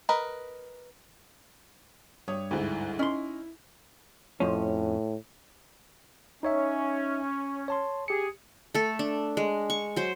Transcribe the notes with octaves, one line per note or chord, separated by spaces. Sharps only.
A#4 B4 D#5
G2 C#5 D#6
D2 G#2 E4
C#4 D#4 C6
F2 A2 F3 C#4
C#4 D#4 C#5 E5
C#5 A5 C6
G4 G#4 C#7
A3 A4
D4
G#3
C#6
F#3 C5